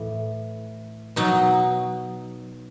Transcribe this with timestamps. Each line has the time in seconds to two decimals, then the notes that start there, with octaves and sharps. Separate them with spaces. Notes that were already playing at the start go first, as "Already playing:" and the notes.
Already playing: A2 E3
1.16 B2 F#3 D#4